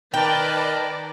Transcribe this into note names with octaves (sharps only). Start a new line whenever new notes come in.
D#3 A#4 B4 D5 G5 A5